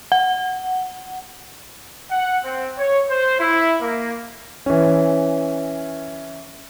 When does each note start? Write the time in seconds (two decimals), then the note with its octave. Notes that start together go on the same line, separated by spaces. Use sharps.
0.12 F#5
2.11 F#5
2.44 C4
2.79 C#5
3.10 C5
3.40 E4
3.82 A#3
4.66 E3 C#4